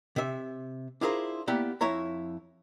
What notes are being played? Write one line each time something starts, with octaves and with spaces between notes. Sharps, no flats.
C3 E5
D4 E4 F4 G#4 A#4 C5
A#3 B3 E4 G4 D5
F2 E4 C#5 A#5